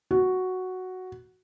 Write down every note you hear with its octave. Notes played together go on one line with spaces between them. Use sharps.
F#4